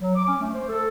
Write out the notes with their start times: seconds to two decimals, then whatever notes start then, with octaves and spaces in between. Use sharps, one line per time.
0.01 F#3
0.16 D6
0.27 C#4
0.40 A3
0.53 C5
0.69 A4